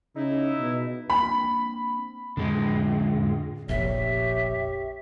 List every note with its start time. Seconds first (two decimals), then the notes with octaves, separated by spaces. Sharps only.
0.16 C#3 D#4 E4
0.58 B2
1.10 A#3 C4 D4 B5
2.37 F2 A2 D3 G#3
3.16 A2
3.69 F1 A#1 G4 C#5 E5